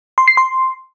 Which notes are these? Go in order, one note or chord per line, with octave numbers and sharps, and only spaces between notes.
C6
C7
C6